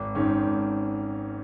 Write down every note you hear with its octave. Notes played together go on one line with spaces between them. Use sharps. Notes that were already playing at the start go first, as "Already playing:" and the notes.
Already playing: G#1
G#2 D#3 C#4
G#1